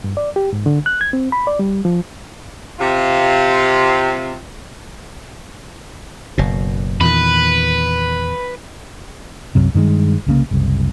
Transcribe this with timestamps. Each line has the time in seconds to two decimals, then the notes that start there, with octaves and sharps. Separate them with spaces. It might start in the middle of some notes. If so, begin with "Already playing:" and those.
0.04 G2
0.17 D5
0.36 G4
0.53 G#2
0.66 D3
0.86 F#6
1.01 G#6
1.13 C4
1.32 B5
1.47 D5
1.59 G3
1.85 F3
2.80 C3 F4
6.38 F#1 B2
7.01 E2 A#2 D#3 B4
9.55 C2 F#2 C3
9.75 G2 D#3 G3 G#3
10.27 C2 C#3 A#3
10.51 F#1 C2